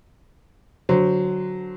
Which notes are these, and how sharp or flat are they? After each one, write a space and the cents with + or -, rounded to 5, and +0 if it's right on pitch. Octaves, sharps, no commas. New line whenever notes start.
D3 +0 F#3 +0 C5 -15